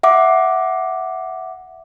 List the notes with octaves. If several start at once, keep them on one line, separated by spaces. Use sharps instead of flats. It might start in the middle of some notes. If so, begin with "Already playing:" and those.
E5 F#5 D6